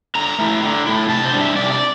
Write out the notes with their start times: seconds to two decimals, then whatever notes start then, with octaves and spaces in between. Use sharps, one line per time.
0.15 D3 A#5
0.39 A3 E4
0.63 D3
0.86 A3 E4
1.09 C3 A5
1.25 C5
1.33 G3 D4
1.40 E5
1.56 C3 D5
1.72 D5